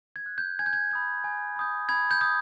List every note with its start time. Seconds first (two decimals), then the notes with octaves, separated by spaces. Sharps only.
0.16 G#6
0.26 F#6
0.38 G6
0.59 G#5 G#6
0.66 G6
0.73 G#6
0.91 B5 D#6 G6
1.24 G#5
1.56 B5 D#6 G6
1.89 B5 G#6
2.11 G6
2.21 D#6 G6